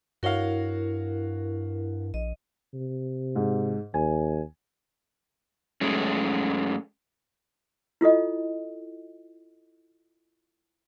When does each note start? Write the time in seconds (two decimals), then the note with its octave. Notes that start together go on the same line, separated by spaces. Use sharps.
0.23 G2 E4 F#4 A#4 C#5 F5
2.14 A#1 D#5
2.73 C3
3.35 G#2
3.94 D#2 G#5
5.81 F#2 G#3 A3 C#4
8.01 E4 F4 A4 D#5